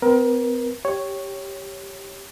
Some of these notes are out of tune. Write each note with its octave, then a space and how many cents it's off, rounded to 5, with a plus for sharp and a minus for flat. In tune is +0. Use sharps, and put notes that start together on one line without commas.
C4 -45 A#4 +30
G4 +0 C#5 +0